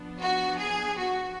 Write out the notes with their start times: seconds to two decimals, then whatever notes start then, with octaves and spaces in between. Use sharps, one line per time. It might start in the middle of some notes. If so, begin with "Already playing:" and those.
Already playing: F3 B3 D4
0.20 F#4
0.58 G#4
0.96 F#4